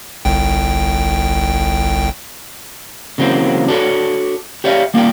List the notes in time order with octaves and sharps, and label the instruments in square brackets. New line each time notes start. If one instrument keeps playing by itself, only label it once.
[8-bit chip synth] G1 C2 G5
[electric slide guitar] C#3 E3 F#3 A#3 C4 C5
D4 F#4 A4 C5 C#5
G4 C#5 D5 E5 F5
G3 A#3 F4 D5 G5